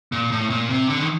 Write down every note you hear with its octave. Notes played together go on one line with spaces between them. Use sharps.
A#2
A2
A#2
C3
D3
D#3